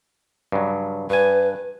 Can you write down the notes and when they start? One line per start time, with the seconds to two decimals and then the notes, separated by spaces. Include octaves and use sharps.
0.52 G2 C#3 F#3
1.10 G2 B4 G#5